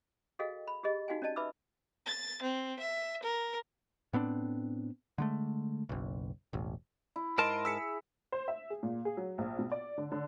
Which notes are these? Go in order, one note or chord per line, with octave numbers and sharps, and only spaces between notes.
F#4 G#4 A4 D#5 F5 G5
B5
G4 G#4 D#5
D#4 F#4 F5 G5 G#5
C#4 D5 D#5 A5
B4 E5 B5 D6 E6
A6
C4
E5
A#4
A2 B3 C4 D4
D3 G#3 A3
F#1 B1
E1 A1
E4
G#2 A#4 D#5 A5 C6 D7
G#4 E6 B6 C#7
C5
E5
G#4
A#2
G#4
F#3
A#1
B2
D5
D3
D3